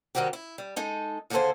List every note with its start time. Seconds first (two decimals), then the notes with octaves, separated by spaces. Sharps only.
0.15 C3 D#3 G3 C4 F#4 G4
0.33 E4
0.58 G3
0.76 G#3 D#4 A4
1.30 D#2 D3 A#3 G#4 A4 C5